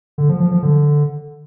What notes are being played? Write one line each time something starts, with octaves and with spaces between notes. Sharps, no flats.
D3
F3
F3
F3
D3